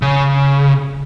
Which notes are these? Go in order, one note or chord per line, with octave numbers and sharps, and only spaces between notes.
C#3